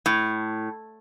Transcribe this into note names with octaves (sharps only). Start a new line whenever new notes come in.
A2